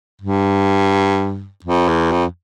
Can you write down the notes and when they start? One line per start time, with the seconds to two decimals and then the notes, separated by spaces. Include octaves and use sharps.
0.21 G2
1.64 F2
1.88 E2
2.12 F2